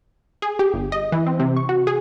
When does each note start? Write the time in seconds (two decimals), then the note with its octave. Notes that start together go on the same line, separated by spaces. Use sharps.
0.42 G#4
0.59 G4
0.74 G1
0.92 D#5
1.12 E3
1.27 C4
1.39 C3
1.57 C#6
1.69 F#4
1.87 G#4